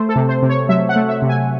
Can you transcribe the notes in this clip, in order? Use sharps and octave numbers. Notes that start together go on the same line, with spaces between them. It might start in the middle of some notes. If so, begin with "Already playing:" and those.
Already playing: A3 C5
A4
C3
C5
C3
C#5
F#3 E5
F#5
A3
E5
C3
G#5